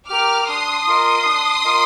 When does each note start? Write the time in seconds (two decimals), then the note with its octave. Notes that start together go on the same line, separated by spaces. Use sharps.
0.09 G4 A#4 D6 F6
0.48 D4 C6 D#6
0.87 F4 A#4 D#5
1.25 D4
1.64 F4 A#4 D#5